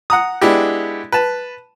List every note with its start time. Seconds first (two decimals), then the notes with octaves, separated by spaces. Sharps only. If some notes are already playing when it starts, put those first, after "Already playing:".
0.10 F#5 A#5 D#6
0.41 G#3 B3 D4 E4 G4
1.12 B4 A5